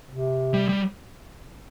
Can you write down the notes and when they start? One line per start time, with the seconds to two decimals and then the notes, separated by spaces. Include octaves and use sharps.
0.09 C3
0.54 G3
0.69 G3